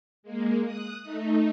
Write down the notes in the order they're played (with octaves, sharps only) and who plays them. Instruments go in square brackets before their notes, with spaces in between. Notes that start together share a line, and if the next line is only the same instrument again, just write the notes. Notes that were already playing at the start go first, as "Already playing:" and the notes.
[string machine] G#3 A#3
D#6 F#6
A3 D#4